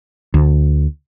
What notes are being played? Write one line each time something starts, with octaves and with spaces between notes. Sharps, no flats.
D2